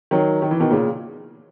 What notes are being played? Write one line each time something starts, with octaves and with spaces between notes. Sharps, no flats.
D#3 F#3
D#3
E3
B2 D#3
A#2 C#3